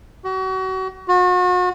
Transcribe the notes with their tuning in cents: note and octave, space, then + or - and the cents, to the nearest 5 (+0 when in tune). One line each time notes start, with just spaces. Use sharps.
F#4 +35
F#4 -40